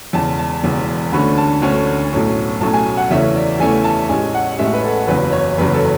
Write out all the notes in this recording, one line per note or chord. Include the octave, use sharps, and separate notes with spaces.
E1 E2 C#3 A5
A5
E1 E2 C#3
D2 D3 A3 C#4 B5
A5
D2 D3 A3 C#4
B1 A2 F#3 A3 C#4
B1 A2 F#3 A3 C#4 A5
G#5
F#5
E2 C#3 E3 A3 C#4 E5
D5
E2 C#3 E3 A3 C#4 G#5
A5
A1 A2 G#3 C#4 G#5
F#5
A1 A2 G#3 C#4 E5
B4
A4
F#1 E2 C#3 F#3 B4
C#5
F#1 E2 C#3 F#3 B4
A4